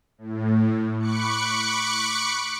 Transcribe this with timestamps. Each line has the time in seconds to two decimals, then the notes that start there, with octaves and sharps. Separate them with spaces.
0.18 A2
0.99 B5 C#6 D6 F#6 C#7